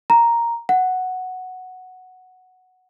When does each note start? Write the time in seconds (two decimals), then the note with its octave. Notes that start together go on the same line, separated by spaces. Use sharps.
0.10 A#5
0.69 F#5